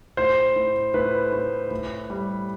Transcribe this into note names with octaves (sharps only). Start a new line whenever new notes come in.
A2 C5
A2
A2 B4
A2
A2
G3